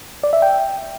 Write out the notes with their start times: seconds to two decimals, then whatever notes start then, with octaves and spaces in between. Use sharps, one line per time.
0.23 D5
0.33 E5
0.42 G5